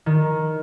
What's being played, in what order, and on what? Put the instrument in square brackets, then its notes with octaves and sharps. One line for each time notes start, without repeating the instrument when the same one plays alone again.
[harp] D#3